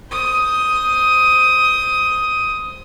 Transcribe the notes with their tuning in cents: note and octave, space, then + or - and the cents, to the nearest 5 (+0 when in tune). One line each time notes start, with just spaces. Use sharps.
C5 +0 D#6 +10